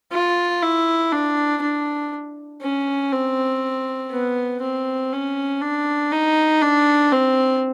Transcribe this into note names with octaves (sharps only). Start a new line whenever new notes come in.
F4
E4
D4
D4
C#4
C4
B3
C4
C#4
D4
D#4
D4
C4